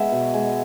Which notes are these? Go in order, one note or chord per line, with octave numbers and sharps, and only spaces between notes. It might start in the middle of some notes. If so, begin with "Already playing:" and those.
Already playing: G#3 B3 E5
B2
G#3